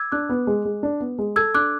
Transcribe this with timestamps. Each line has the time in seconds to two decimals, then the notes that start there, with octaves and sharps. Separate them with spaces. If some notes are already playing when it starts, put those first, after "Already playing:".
Already playing: D6 E6 G#6
0.12 D4 D6 F#6
0.29 B3
0.47 G#3
0.65 G#3
0.83 D4
1.00 B3
1.19 G#3
1.36 A4 E6 G#6
1.54 D4 D6 F#6